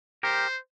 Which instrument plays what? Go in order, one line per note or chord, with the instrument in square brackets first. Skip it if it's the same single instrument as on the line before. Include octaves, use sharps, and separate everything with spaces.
[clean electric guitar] G4 A#4 [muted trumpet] C5